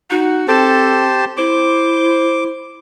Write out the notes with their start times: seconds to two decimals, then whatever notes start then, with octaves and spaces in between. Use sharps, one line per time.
0.10 D#4 F#4
0.48 C4 G4 A4 C5 A5
1.37 E4 C5 D6